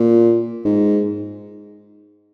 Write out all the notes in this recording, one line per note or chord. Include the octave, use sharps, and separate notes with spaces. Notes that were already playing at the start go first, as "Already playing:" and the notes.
Already playing: A#2
G#2